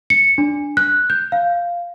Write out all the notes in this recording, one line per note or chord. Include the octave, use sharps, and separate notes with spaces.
C#7
D4
F#6
G6
F5